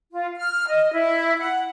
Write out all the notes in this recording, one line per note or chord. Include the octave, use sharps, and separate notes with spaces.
F4
F6
D#5
E4
F#5